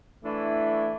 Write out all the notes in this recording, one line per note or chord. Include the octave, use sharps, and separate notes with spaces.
E3 A3 D4 E4